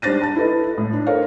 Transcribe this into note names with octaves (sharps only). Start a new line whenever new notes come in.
G3 D4 C5 A6 A#6 D#7
A5 A6
E4 A4 B4 D#5
A2
D4
A4 A#4 C5 C#5 F5